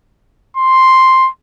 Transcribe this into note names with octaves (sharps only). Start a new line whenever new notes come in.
C6